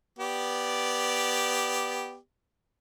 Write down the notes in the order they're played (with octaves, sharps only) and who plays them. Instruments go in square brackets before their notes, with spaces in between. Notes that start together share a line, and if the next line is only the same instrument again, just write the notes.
[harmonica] B3 G4 D5